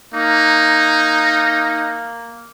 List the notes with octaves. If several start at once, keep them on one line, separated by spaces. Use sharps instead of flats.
A#3 D#4